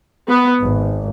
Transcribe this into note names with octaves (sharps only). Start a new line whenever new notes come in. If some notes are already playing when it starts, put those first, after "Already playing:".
B3
G#1